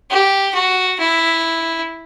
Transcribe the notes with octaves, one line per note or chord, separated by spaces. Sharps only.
G4
F#4
E4